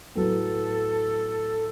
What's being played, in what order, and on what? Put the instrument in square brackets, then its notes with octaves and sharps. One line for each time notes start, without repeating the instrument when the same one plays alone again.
[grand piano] A2 F#3 B3 [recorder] A4